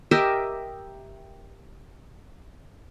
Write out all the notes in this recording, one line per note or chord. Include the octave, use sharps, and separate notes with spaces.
G4 A#4 D#5 E5